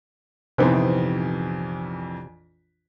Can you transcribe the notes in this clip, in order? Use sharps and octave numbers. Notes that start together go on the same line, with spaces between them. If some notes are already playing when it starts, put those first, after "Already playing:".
A#1 F2 C3 D#3 E3 B3 C4